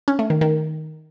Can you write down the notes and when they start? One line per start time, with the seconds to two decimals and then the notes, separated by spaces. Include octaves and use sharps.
0.08 C#4
0.19 A3
0.30 D#3
0.41 D#3